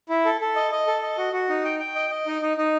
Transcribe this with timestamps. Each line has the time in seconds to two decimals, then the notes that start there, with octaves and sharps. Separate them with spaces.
0.09 E4
0.25 A4
0.41 A4
0.56 D#5
0.72 D#5
0.87 A4
1.02 D#5
1.18 F#4
1.33 F#4
1.49 D#4
1.65 G5
1.80 G5
1.95 D#5
2.10 D#5
2.26 D#4
2.42 D#4
2.57 D#4